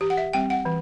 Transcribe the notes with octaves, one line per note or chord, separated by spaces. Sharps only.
E3 G4
F#5
E5
G3 C4 G5
F#5
E3